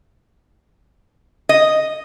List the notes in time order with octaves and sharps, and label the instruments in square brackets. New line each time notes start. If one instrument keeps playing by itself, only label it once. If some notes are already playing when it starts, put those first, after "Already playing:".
[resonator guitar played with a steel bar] D#5